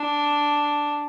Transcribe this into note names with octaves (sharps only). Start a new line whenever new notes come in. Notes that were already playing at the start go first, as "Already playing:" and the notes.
Already playing: D4